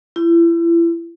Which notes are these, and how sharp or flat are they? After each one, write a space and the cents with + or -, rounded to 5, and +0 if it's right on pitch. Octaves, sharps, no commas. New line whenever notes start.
E4 +35